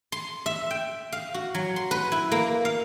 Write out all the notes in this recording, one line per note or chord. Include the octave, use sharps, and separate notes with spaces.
C6
E5
G5
F5
F#4
F#3
C6
B4
E4
A#3
F5